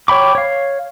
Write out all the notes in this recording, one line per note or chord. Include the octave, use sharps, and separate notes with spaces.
C#5 G5 B5 D6
C#5 F5